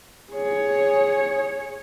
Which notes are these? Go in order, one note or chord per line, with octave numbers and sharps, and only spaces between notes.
G#4 C#5